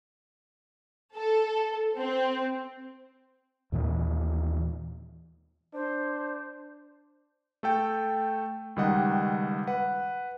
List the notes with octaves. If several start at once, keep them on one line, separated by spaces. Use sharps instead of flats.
A4
C4
D#2 A#2 E3
D4 C5
A3 A4 G5
C#2 D#3 G3 D#5 F#5
B4 F#5